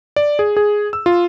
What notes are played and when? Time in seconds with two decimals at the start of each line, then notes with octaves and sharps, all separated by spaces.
0.16 D5
0.39 G#4
0.57 G#4
0.93 E6
1.06 F4